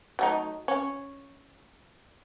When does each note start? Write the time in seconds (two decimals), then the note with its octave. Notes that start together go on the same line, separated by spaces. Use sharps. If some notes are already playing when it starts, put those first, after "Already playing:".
0.19 F#3 A3 D#4
0.68 C#4